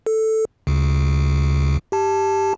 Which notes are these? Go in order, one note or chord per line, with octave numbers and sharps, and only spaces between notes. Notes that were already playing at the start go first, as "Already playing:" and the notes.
A4
D2 C#3
G4 A5